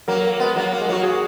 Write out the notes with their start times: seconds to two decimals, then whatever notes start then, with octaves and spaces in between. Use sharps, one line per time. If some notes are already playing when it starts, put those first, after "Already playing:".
0.08 F#3 A#3 A#4
0.24 A#4
0.39 G#3 B3
0.56 F#3 A#3
0.72 A#3
0.81 G#3
0.88 F#3 A#3 F#4
1.03 G#4